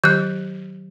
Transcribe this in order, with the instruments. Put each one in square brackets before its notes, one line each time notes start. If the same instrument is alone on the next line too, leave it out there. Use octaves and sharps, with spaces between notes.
[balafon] D#3 F#3 G4 [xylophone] F#6 G6